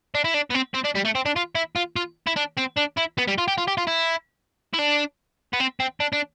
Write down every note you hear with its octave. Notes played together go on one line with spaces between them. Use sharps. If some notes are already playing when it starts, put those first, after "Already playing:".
D4
E4
D4
B3
C4
C4
D4
G3
A3
C4
D4
F4
E4
F4
F4
E4
D4
C4
D4
E4
B3
G3
F4
G4
F4
G4
F4
E4
E4
D4
B3
C4
C4
D4
D4